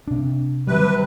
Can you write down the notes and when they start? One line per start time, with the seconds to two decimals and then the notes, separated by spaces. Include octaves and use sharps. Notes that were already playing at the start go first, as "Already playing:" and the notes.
0.08 C3 D4
0.67 C3 D#3 F#3 G3 B4